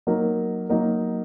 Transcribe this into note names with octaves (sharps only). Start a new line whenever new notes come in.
F#3 A#3 D#4 A#4
F#3 A#3 D#4 A#4